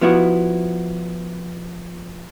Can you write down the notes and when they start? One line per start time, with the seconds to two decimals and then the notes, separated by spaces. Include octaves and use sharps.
0.01 F3 B3 E4 F#4